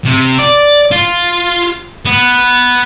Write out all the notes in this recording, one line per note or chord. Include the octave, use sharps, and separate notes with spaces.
C3
D5
F4
B3